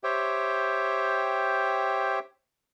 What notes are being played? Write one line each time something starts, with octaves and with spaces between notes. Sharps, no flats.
G4 C5 C#5 E5 G5